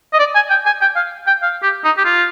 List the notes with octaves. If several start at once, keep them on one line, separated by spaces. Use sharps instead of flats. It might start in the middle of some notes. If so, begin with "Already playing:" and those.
D#5
D5
G#5
G5
G#5
G5
F5
G5
F5
G4
D#4
G4
F4